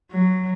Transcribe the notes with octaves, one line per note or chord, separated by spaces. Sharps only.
F#3